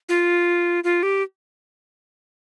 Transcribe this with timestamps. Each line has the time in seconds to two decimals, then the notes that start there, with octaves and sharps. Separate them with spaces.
0.09 F4
0.84 F4
1.03 G4